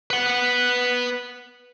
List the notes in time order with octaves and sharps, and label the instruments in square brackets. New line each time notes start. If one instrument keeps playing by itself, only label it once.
[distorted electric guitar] B4 F#5